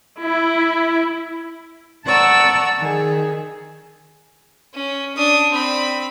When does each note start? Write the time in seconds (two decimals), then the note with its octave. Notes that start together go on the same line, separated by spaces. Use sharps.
0.20 E4
2.07 D5 F#5 A5 A#5 C#6 E6
2.79 D#3 G#4
4.74 C#4
5.16 D4 D#6
5.53 C4 B5